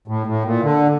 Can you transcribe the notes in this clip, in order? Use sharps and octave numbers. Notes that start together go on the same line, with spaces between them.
A2
A2
A#2
D3